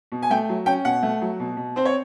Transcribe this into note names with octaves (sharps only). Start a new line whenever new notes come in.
B2
G#5
A3 G5
F#3
C#4 G5
B2 F#5
A3
F#3
B2
B2
C4 C5
C#5